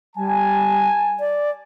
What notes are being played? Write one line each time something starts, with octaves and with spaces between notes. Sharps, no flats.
G3 G#5 A5
D5